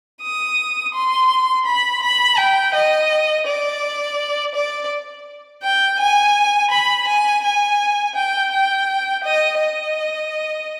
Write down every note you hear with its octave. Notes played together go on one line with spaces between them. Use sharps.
D#6
C6
B5
B5
G5
D#5
D5
D5
G5
G#5
B5
G#5
G#5
G5
G5
D#5
D#5